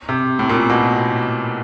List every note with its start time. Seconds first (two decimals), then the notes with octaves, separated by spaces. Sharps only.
0.09 C3
0.39 A2
0.49 A#2
0.70 B2